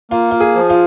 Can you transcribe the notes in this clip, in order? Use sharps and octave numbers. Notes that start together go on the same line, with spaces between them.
A#3 F4
F4
G#4
F3
F4